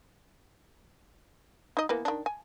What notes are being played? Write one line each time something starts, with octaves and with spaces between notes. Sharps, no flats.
D#4 D#5
E3 A#3 B3
D#3 D4
G#5